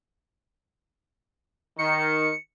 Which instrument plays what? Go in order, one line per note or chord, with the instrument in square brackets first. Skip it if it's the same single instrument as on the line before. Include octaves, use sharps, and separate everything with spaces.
[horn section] D#3 [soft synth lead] C#7